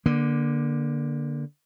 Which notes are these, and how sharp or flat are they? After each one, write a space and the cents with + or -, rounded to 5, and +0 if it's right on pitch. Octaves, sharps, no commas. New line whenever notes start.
D3 +0 A#3 +25